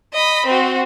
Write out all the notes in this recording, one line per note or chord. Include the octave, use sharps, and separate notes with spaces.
D#5 B5
C4 F#4